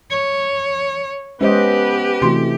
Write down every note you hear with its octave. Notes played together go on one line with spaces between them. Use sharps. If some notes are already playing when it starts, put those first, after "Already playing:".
C#5
G#3 B3 C#4 G4 B4 C5 D#5
C3 E3 A3 C4 F#4 C6